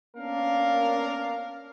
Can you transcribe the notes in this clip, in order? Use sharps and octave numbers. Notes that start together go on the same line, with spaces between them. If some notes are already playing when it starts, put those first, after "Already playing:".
A#3 B3 C#4 D4 A#4 F5